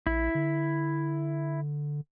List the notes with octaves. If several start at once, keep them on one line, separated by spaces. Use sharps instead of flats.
A#1 E4
D3